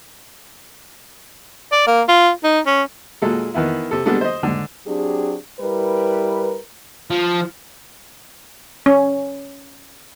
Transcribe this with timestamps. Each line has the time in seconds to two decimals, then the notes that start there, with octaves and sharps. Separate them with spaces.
1.72 D5
1.87 A#3
2.08 F4
2.43 D#4
2.67 C#4
3.22 A#2 F#3 G#3 A4
3.54 D#3 E3 B3 E4
3.91 C3 A4
4.06 G3 G#3 B3 D4 A4
4.21 C5 D#5
4.43 G#2 D3
4.86 F#3 C4 D4 G4 G#4
5.60 G3 E4 A#4 B4
7.10 F3
8.86 C#4